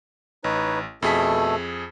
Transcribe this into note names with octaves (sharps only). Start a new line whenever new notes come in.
A1 D#4 B4 C#5
F2 B2 A3 G#4 A4 B6